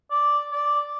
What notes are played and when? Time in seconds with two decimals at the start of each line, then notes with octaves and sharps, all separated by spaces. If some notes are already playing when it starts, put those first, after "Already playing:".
0.10 D5
0.52 D5